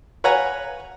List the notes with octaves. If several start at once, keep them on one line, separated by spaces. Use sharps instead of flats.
B4 C#5 F5 F#5 G#5 A#5